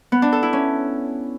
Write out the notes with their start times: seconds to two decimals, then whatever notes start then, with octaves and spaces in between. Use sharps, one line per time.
0.12 B3
0.22 D4
0.32 A4
0.43 E4
0.53 C#4